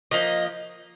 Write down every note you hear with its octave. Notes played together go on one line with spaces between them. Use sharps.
F3 A#3 D#4 D#5